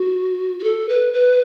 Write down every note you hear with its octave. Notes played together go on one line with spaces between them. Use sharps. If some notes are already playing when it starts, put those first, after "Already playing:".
Already playing: F#4
F#4
A4
B4
B4